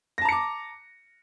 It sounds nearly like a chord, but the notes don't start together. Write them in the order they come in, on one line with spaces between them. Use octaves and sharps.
A#6 A5 A#5 C#7 D6